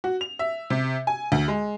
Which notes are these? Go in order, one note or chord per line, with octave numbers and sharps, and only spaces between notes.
F#4
F7
E5
C3
G#5
D2
G#3